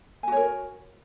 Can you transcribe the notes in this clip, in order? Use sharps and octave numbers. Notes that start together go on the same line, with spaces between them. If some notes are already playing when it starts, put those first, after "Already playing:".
F#4 A#4 C#5 G#5